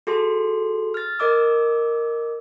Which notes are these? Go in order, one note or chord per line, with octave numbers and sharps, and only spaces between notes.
F#4 G#4 A4 C6
F6 A6
A#4 D#5 D6 E6